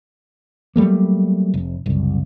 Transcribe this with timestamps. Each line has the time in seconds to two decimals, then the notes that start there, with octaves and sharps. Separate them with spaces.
0.76 F#3 G3 A3 A#3
1.54 F1
1.86 F#1 C2